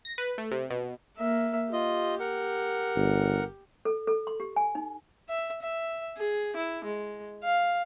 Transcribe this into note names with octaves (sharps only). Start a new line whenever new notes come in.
A#6
B4
A3
C3
B2
A#3 E5
F4 G4 D#5
A#4 F#5
G1
A4
A4
C6
G4
G#5
D#4
E5
E5
G#4
E4
G#3
F5